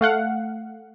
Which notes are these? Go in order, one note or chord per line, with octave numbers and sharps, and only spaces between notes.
A3 F5 F#5